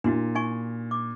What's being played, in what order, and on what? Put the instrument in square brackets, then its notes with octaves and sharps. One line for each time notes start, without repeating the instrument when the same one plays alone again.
[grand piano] A#2 [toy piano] D4 E4 F#4
[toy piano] D#4 G#5 C#6
D6